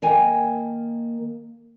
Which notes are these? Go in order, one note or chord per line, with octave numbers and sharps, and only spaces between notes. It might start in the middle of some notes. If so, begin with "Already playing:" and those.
D#3 A#3 G5 G#5